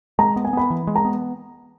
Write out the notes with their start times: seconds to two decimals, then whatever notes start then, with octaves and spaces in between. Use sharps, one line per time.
0.19 G#3 A#5
0.36 B3
0.45 G#5
0.53 B3 B5
0.70 E3
0.87 G#3
0.96 A#5
1.05 B3